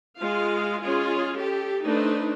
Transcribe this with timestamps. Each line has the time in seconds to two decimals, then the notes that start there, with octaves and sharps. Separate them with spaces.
0.19 G#3 F4 F5
0.82 G#3 C#4 F4 G#4
1.38 G4 A4
1.85 A3 D4 D#4 B4 C5